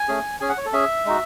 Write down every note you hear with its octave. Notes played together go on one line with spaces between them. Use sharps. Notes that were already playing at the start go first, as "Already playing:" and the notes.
Already playing: G#5
A3 C#4 G#4
C#4 G#4 G#5
F#5
C#5
A4
C#4 G#4 E5
G#3 D#4 F#4